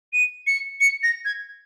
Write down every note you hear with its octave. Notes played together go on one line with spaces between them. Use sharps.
D#7
C#7
C#7
A#6
G#6